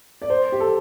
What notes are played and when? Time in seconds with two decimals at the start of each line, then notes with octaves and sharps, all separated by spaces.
0.22 D5
0.30 C5
0.52 G4
0.60 A4